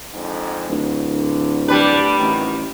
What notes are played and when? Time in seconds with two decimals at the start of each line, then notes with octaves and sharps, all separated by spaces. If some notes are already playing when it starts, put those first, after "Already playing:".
0.14 F2 G#2 D3
0.69 D1
1.12 D3
1.68 G3 D4 B4
2.19 A1 C3 D#3 F#3